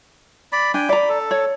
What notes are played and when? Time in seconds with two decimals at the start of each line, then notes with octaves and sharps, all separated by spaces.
0.52 D5 B5
0.74 D4 G5 G#5
0.89 D5 A#5 B5
1.09 A4
1.31 C#5